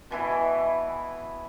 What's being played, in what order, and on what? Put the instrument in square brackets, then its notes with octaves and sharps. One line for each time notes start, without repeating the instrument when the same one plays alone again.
[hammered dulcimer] B2 E3 E4 D#5